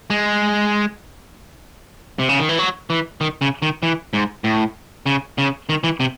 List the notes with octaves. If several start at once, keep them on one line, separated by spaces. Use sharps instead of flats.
G#3
C3
C#3
D#3
E3
F#3
E3
D#3
C#3
D#3
E3
G#2
A2
C#3
C#3
D#3
E3
C3